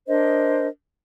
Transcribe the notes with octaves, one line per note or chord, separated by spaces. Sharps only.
D4 A#4 C5 D#5